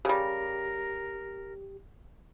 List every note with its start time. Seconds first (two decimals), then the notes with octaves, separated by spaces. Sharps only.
0.05 C#3 G3 G4 A#4